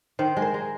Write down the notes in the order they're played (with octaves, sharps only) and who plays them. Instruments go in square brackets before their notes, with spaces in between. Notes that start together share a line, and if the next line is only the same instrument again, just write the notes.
[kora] D#3 [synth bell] C5
[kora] G#3
[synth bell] A#4
[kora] G#3